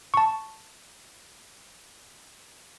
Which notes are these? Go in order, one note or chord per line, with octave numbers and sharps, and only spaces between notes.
A5 C#6